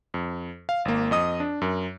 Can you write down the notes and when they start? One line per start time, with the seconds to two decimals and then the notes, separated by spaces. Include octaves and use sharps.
0.14 F2
0.69 F5
0.85 G#1 A#3
1.11 F2 D#5 D#6
1.40 D4
1.62 F#2 A#4